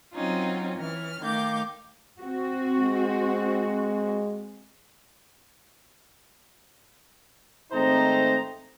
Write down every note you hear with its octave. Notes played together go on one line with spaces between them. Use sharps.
F#3 C4 C#4 D#4 F4
E3 C#4 F6
D#3 A3 F5 D6 G6
C4 F#4
G#3
G#1 A3 C4 D#4 C5 A#5